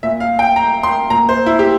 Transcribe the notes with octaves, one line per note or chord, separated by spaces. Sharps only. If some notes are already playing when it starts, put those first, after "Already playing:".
A#2 E5
F5
G5
A#5
C6
A#2 A#5
C5
E4
G4